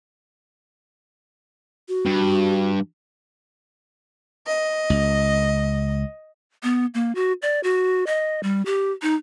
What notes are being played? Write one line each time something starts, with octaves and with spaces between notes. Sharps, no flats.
F#4
G2
D#5
C#2
B3
A#3
F#4
D5
F#4
D#5
G3
G4
D#4